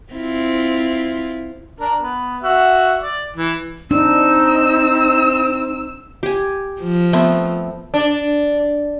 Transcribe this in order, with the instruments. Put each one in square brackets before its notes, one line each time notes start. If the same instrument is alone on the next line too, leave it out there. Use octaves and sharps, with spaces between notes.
[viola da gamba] C4 E4 F4
[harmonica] D4 A#4
B3
F#4 E5
D5
E3
[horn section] C4 [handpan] D4 [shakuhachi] D#4 [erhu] E6
[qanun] G4 G#5
[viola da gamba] F3
[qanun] A3 B3 C4
[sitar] D4